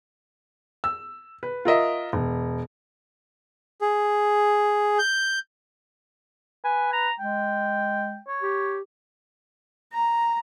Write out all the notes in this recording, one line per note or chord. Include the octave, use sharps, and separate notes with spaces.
E6
B4
F4 A#4 D#5 E5
E1
G#4
G6
B4 G#5
A#5
G#3 G5
C#5
G4
A#5